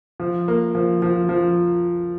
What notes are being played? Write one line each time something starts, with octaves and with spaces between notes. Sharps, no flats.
F3
A#3
F3
F3
F3